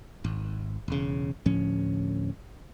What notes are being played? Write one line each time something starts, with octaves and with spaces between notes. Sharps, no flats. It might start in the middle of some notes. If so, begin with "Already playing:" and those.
G#1
E1 C#3
D2 A2 F3 C#4